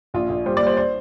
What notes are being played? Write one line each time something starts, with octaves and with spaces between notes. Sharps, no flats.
A#1 F4
A#1
G3 C5
D5
G3
C5
C5